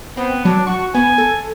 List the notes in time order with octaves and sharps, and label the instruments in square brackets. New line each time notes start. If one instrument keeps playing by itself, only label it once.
[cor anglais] B3 [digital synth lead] C4
[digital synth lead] F#3 [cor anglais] D4
[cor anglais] F#4 [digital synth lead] C#6
[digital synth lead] B3 [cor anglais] G#5
[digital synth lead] A4